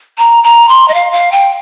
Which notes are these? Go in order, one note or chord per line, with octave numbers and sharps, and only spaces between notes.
A#5
A#5
C6
D#5
F5
F5
G5